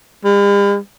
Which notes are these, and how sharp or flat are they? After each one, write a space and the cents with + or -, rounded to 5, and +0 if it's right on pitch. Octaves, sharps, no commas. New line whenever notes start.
G3 +45